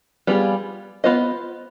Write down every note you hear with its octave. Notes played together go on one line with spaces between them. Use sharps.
G3 B3 D4 F4 G#4
B3 F4 C5 D#5